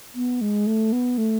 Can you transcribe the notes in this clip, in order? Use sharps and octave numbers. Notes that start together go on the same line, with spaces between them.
B3
G#3
A3
B3
A3